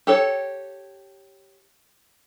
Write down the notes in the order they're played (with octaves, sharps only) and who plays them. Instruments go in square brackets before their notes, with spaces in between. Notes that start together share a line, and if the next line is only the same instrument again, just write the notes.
[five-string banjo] G4 A4 C#5